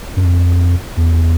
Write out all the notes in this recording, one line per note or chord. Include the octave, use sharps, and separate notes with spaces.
F#2
F2
E2